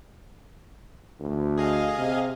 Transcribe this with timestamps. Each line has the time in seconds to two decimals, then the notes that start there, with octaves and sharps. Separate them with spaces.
1.20 D2
1.58 G#4 D#5 F5
1.98 C3